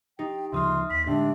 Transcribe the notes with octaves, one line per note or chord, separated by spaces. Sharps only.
D#4 G4 G5
D2 C#3 F3 E5 C6 D#6 F6
D#2 C6 B6
A2 D3 G#3 D4 G4 E5 G5